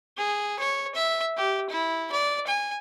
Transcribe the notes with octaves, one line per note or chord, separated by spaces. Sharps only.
G#4
C#5
E5
G4
E4
D5
G#5